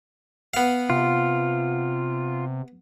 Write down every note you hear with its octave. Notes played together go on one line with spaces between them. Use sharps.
B3 F5
C3 F4